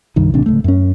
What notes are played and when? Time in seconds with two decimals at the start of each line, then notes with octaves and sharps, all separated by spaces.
0.16 C2 G2 D#3
0.34 A1 C3 D4
0.46 D1 C#2 A3
0.64 F#2 C#4